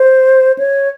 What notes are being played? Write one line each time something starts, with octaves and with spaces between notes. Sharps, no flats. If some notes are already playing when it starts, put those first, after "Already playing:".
Already playing: C5
C#5